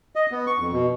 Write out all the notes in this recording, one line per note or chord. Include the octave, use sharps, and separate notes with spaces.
D#5
B3
C#6
F2
B2